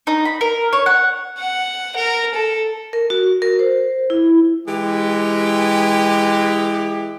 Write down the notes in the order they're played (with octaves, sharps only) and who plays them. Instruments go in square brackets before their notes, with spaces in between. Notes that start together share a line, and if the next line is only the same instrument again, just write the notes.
[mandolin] D#4
B5
A#4
C#5
F#5
[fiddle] F#5
A#4
A4
[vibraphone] A#4
F#4
A#4
C5
E4
[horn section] E3 G#3 G4